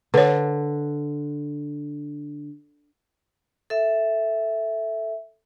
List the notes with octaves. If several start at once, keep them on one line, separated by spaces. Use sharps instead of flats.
D3 B4 C#5
A4 E5